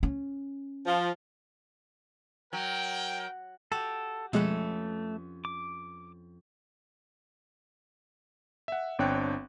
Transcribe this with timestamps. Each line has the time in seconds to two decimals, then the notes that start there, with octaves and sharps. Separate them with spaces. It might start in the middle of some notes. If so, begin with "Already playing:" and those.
0.03 C#4
0.86 F3
2.53 F#3 A#4 G5
3.72 F#4 G4 A4
4.33 F2 B2 G#3 A3 C#4 B4 F#6
5.45 D6
8.68 E5 F#5
8.99 G1 C4 D4 C#5 G5 F#6